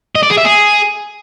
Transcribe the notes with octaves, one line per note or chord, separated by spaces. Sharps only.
D#5
D5
G#4
E5
G#4